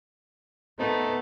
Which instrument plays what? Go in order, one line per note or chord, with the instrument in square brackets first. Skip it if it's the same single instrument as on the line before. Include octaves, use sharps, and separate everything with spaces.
[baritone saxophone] A3 [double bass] B3 [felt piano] C4 A#4 [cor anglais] D#4